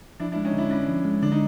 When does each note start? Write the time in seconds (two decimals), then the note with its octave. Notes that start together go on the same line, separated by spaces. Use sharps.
0.20 F3 D4 E4
0.32 D4 E4
0.36 G#3
0.45 C#4 D#4
0.53 D3 D4 E4
0.70 C#4 D4 E4
0.88 F3
1.05 G#3
1.22 D3 D4
1.32 D#4